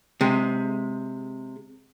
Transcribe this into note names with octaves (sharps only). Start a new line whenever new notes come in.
C3 G#3